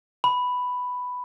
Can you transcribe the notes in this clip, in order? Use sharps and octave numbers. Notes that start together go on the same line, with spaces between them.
B5